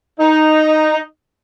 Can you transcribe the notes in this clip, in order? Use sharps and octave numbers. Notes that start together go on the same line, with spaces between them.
D#4